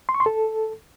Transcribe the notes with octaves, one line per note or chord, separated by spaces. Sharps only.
C6
C#6
C6
A4